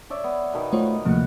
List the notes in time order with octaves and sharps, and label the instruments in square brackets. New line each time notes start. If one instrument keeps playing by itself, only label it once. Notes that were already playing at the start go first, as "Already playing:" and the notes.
[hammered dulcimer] C#5 D5 E5
B3
B2 D#3 B5
[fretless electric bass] A3 [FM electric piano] F4 C5 C#5
[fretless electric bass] D2 C3 A#3 [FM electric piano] F3 A3 [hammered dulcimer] A#4 F#5